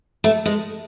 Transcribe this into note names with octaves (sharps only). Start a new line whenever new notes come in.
A3
G#3